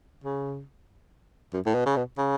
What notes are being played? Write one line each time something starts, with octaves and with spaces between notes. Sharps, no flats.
C#3
F#2
A2
B2
C#3
B2
C#3